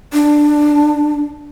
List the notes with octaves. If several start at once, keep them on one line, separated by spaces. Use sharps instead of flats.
D4